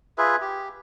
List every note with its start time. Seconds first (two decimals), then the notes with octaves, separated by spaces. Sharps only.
0.18 F4 G#4 B4 E5
0.41 G4